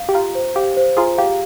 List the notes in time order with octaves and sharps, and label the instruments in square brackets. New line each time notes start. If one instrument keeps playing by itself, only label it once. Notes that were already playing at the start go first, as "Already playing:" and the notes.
Already playing: [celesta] F5
[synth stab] G4
[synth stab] F4 [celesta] A#5
[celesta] C5
[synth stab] G4 [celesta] F5
[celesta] C5
[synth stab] F4 G#4 [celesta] A#5
[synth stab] G4 [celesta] F5